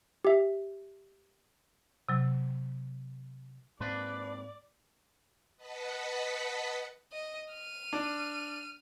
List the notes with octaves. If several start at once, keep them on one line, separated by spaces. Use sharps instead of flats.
G4 E5
C3 F#3
G#2 A#3 C4 D4 B4 D5
B4 D#5 F#5 A5 B6 C#7
D#5
F6 D#7
D4